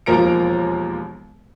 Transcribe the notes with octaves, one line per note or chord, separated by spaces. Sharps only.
E1 D#2 F3 A#4 A#5 D7